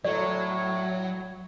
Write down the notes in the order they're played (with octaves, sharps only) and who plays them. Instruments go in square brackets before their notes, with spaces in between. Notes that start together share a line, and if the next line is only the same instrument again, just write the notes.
[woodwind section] A2 [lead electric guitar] F#3 [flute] C#5 [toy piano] D5